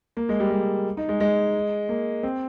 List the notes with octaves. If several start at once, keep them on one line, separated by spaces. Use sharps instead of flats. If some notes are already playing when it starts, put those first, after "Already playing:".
A#3
G#3
G3
G#3
D#4
G#3
G#3
A#3
C4